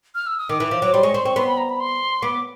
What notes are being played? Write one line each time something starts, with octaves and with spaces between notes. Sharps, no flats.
F6
E6
D#6
D#3 D6
E3
F3
F#3
G3 C6
G#3 C#6
C4 C6
C4 C#6
B3 C6
B5
A#5
B5
C6
B3 D6